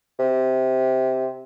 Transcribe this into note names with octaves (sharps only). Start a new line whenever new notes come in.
C3